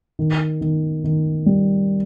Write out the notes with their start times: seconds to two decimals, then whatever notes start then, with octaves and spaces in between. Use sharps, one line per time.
0.19 D#3
0.61 D#3
1.04 D#3
1.46 G3